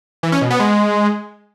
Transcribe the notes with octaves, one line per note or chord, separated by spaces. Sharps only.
E3
C#4
B2
B3
G#3